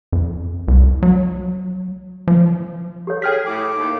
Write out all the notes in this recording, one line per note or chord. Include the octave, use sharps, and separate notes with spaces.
F2
C2
F#3
F3
G4 A4 C#5
G#4 G5 F6 B6
A2 D6
D#2